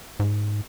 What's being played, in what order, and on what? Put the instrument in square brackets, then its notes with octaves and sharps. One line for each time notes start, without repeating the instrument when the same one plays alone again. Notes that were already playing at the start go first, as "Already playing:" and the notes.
[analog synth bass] G#2